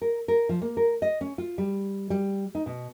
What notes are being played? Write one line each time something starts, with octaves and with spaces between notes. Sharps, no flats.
A#4
A#4
F3
A#3
A#4
D#5
C#4
F4
G3
G3
D#4
B2